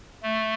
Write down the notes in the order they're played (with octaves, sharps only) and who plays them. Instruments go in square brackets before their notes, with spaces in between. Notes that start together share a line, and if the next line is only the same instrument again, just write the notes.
[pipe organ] A3